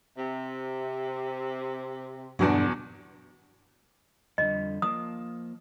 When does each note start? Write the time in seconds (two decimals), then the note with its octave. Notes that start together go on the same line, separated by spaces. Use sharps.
0.17 C3
2.39 E2 G2 B2 D3 F#3 B3 D4
4.38 F2 D3 G3 D#5
4.82 F3 A#3 A5 D#6